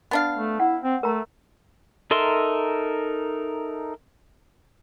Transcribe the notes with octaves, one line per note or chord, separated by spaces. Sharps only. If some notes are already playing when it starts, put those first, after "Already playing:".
B3 D4 F5
A3
E4 F#5
C4
A3 A#4 A#5
D#4 A4 A#4 E5 C6